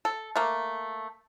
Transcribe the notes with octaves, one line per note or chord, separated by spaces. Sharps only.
A4
A3 A#3